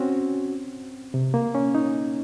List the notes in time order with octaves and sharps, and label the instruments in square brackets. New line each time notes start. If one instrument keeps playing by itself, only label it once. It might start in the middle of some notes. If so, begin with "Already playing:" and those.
Already playing: [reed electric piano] C4 C#4 F#4
C3
A#3
C#4
D#4